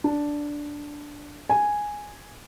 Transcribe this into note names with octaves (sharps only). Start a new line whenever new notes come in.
D4
G#5